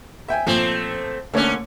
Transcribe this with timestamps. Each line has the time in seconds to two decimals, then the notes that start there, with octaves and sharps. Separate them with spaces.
0.28 E5 G5 G#5
0.47 A#2 F3 A3 C4
1.34 D3 A3 A#3 C#4 C#5